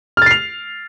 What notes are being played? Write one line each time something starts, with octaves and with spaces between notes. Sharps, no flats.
F6 A6 C7 F7